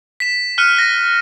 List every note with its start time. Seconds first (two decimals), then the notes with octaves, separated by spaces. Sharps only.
0.20 B6 E7
0.58 F6 F#6 C#7 D#7
0.77 F#6 A#6